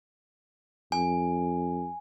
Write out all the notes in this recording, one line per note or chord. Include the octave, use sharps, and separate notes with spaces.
F2 G#5